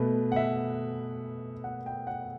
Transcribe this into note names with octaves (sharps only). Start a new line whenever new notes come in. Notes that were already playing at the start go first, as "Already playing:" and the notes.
Already playing: B2 A3 B4
F#5
E5
F#5
G5
F#5